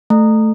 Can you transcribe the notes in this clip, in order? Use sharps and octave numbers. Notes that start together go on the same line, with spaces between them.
A3